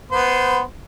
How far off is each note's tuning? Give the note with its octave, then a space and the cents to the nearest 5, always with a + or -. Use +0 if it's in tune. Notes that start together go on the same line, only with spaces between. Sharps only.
B3 +0 C5 -20